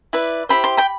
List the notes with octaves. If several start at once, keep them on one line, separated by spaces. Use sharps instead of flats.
E4 B4 D5
E4 G4 C5 B5
C6
G5 B5